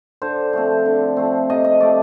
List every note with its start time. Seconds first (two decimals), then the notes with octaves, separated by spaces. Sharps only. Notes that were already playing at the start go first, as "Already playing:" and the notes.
0.22 D3 C5
0.53 F3 A3 C4
0.86 D3
1.17 F3 A3 C4
1.50 C3 D#5
1.64 D#5
1.80 F3 A3 C4 D5